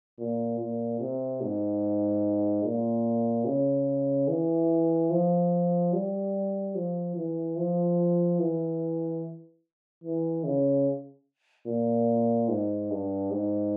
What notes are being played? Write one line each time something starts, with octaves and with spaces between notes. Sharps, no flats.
A#2
A#2
C3
G#2
A#2
C#3
E3
F3
G3
F3
E3
F3
E3
E3
C#3
A#2
G#2
G2
G#2